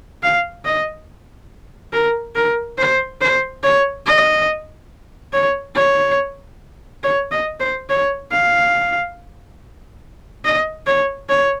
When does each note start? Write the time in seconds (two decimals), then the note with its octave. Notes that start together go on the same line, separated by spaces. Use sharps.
0.23 F5
0.65 D#5
1.93 A#4
2.35 A#4
2.78 C5
3.21 C5
3.63 C#5
4.06 D#5
5.33 C#5
5.75 C#5
7.03 C#5
7.31 D#5
7.60 C5
7.89 C#5
8.31 F5
10.45 D#5
10.87 C#5
11.29 C#5